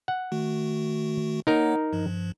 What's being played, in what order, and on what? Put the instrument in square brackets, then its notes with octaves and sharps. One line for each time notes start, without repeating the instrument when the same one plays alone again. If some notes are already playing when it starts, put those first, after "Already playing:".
[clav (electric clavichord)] F#5
[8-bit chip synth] D#3 A3 F#4
[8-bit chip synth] A#3 C#5 F#5 [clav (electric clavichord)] D#4 A#4
[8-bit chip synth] G2 F3